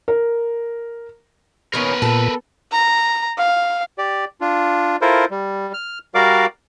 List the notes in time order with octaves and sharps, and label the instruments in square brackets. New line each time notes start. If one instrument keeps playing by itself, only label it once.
[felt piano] A#4
[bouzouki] A#2 D#3 C#4 [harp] B3 [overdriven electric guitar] A#4 B4
[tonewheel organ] A#2 [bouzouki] A4
[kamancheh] A#5
F5
[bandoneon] G4 D5
D4 F4
E4 F4 A4 A#4 C5
G3
F6
G3 F#4 A#4 D5 F5 D6